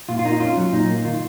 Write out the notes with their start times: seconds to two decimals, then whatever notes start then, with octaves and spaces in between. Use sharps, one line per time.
0.09 A#2 F4
0.19 F4
0.25 A#3 D#4
0.40 C#4 F4
0.57 F#3
0.73 A#2 D#4
0.89 A#3
1.05 D#3 F4